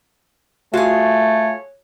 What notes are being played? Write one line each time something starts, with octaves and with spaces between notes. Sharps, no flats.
A3 F4 F#4 G#4 C#5